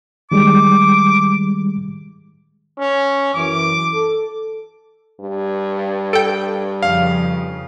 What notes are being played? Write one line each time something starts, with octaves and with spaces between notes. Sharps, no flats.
D#3 G3 G#3 D6
C#4
F#2 E3 D6
A4
G2
A4 G5 D7
F2 C#3 F3 F5